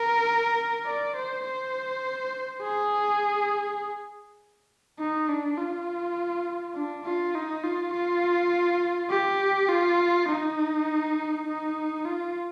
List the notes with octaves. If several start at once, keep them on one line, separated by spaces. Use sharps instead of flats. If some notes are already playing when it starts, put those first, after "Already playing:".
Already playing: A#4
D5
C5
C5
G#4
D#4
D4
F4
D4
F4
D#4
F4
F4
G4
F4
D#4
D#4
F4